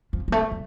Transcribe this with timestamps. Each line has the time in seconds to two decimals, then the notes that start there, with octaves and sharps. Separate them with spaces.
0.13 F3
0.28 G3
0.32 A3
0.51 G3